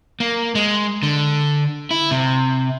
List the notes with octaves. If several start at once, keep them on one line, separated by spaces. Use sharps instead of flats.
A#3
G#3
D3
E4
C3